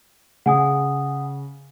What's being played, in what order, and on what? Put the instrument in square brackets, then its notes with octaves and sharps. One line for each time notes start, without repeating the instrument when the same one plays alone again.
[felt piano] C#3 [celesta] F#5 G#5 D#6